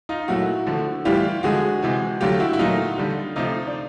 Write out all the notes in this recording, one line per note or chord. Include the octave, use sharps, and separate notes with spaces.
D#4 F4
A#2 F#3 A3 E4 F#4
D3 F3 A3
A2 E3 G3 F4 G4
D3 F3 G#3 F#4 G#4
C3 E3 G#3
D3 F#3 A3 F4 G4
E4 F#4
E4
A#2 F#3 A3 D#4 F4
D3 G3
C3 F3 A3 D#4 F4
D4